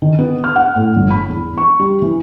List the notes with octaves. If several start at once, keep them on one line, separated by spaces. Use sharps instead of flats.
D#3
B3
F6
F#5
A2
G1
B5
E2
C#6
G3
E3